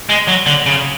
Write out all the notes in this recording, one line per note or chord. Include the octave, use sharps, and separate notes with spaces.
G#3
F#3
D3
C#3